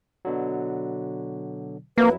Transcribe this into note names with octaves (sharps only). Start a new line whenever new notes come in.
B2 D3 F#3
F2 F#3 A#3 E4 B4